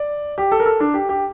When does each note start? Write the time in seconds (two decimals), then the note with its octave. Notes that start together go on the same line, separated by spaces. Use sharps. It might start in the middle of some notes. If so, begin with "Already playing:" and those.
Already playing: D5
0.38 G4
0.51 A4
0.60 A#4
0.66 A4
0.80 D4
0.94 G4
1.09 G4